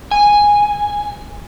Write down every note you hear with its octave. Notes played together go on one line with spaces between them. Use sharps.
G#5